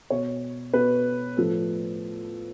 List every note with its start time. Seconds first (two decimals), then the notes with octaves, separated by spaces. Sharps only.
0.10 B2 C#5
0.73 B2 B4
1.37 A2 F3 A4